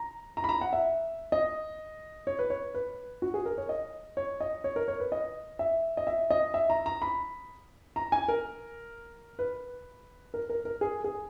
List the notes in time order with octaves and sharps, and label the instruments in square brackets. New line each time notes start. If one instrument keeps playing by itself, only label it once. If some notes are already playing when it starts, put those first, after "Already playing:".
Already playing: [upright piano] A#5
A#5
B5
A#5
F#5
E5
D#5
C#5
B4
C#5
B4
F#4
G#4
A#4
C#5
D#5
C#5
D#5
C#5
A#4
C#5
B4
D#5
E5
D#5
E5
D#5
E5
A#5
A#5
B5
A#5
G#5
A#4
B4
A#4
A#4
A#4
G#4
G#4